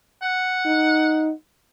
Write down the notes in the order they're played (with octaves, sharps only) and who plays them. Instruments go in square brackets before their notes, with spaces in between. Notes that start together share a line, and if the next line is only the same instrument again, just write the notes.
[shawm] F#5
[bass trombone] D#4